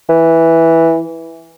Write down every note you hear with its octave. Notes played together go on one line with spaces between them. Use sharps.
E3